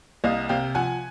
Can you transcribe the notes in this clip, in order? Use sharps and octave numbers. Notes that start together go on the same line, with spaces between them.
C2 D#5 F5
C3 F5 G5
F3 F#5 G#5